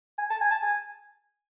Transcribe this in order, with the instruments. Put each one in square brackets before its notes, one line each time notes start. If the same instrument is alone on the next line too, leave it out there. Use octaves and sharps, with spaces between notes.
[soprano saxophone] G#5
A5
G#5
A5
G#5